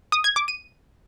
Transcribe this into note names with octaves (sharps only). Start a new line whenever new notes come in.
D#6
G#6
D6
D#7